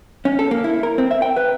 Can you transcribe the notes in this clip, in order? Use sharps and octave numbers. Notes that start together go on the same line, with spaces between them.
C#4
A4
A#3
E4
A#4
C4
E5
G5
B4